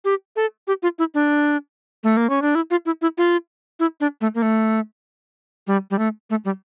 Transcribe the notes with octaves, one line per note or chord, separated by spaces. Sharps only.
G4
A4
G4
F4
E4
D4
A3
A#3
C#4
D4
E4
F4
E4
E4
F4
E4
D4
A3
A#3
A3
G3
G3
A3
A3
G3